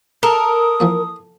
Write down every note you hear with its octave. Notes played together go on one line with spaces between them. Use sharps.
A4 A#4 D#6
E3 F3 A#3